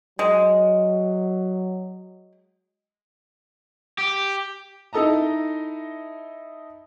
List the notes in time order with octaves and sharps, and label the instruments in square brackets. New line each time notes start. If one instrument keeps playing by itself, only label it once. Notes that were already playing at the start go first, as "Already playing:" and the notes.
[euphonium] F#3 [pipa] G#3
[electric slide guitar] G4
[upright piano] D#4 E4 A4 D#5 A5 A#5